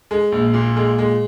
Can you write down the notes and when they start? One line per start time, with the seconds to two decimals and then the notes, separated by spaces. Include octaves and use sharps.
0.11 G#3
0.32 A#1
0.54 A#2
0.76 G#3
0.98 G#3